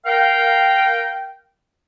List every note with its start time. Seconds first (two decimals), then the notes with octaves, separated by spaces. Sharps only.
0.06 A#4 F5 G5